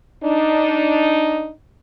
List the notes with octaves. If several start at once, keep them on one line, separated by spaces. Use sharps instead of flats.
D4 D#4